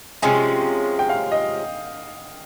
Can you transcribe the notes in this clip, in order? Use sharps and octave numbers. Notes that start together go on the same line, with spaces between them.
C3 F3 G#3 C#4 G#5
G5
F5
D#5